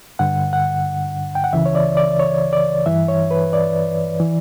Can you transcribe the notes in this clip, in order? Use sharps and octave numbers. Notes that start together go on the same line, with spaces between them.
G2 D3 F#5
F#5
G5
F#5
C#2 C#3 E3 E5
C#5
D5
D5
C#5
D5
G2 E3 E5
C#5
B4
D5
E3